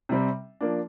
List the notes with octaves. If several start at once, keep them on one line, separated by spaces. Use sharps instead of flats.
C3 G3 C4
F3 A#3 D4